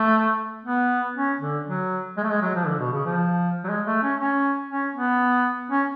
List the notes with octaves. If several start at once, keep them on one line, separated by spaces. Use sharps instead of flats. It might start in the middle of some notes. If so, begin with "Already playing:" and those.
Already playing: A3
B3
C#4
D3
F#3
G#3
A3
G#3
F#3
F3
D3
B2
C#3
F3
F#3
G#3
A3
C#4
C#4
C#4
B3
C#4